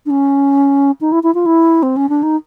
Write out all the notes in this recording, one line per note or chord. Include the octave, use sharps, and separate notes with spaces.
D4
C#4
D#4
E4
E4
F4
E4
C4
C#4
D4
D#4